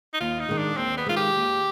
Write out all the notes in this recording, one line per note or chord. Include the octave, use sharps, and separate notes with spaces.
D#4
D#2 F4
D#4
D#3 G#3
D4
D#2 C4
B3
D#3 G#3 F4
G4
D#2